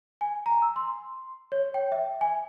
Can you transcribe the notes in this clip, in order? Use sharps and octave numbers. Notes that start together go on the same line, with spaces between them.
G#5
A#5
E6
C6
C#5
G5
E5
G#5